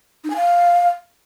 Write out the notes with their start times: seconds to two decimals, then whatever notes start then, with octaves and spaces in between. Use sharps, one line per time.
0.24 D#4
0.30 G#5
0.36 F5